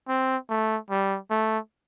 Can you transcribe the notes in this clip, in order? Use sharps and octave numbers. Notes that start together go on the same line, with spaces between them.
C4
A3
G3
A3